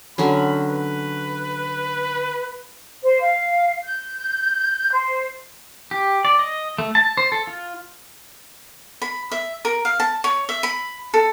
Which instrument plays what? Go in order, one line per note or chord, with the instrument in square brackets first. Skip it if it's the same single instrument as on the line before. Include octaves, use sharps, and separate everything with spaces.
[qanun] D3 F#3 C#4 [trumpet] B5
[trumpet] B4
[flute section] C5
F5
G6
C5
[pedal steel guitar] G4
D5
D#5
A3
A5
C5
A4
F4
[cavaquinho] B5
E5
A#4
F5
A5
C#5
E5
B5
A4